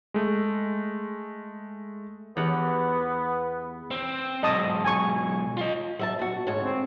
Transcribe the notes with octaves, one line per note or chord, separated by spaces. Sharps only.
G#3 A3
E2 B3 G4 B4 F#5
C4
B1 G#2 D#5 A5 D#6
G#5 C#6
F4 D#5
F#3 E5 A5
A#2 F#4
D2 G#2 C#5
C4